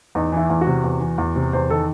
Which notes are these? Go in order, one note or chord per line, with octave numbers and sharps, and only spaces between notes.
E2 D#4
E3 E4
E2
F#4
C3
E2
E3
E2
C3
E2 C5
D#3 A4